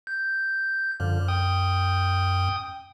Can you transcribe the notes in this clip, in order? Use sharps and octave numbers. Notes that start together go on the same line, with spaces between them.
G6
F#2 D3 F3
G5 D#6